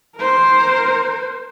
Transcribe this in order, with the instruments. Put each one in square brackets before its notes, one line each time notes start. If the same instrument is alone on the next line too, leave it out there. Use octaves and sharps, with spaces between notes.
[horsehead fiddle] A#4 C5